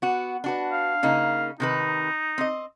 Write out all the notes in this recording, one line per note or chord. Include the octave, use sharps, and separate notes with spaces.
B3 F#4
D4 F#4 B4
F5
C#3 A#3 D#4
C3 D#3 D#4 B4
C4 D#5